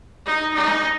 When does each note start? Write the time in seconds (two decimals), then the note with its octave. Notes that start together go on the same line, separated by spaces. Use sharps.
0.26 D#4
0.54 D#4